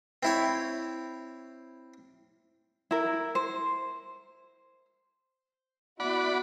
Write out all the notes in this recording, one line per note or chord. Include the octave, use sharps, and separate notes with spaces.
C4 E4 C#5
E4 A#4
C5
B3 E4 F#4 D5 F#5 B5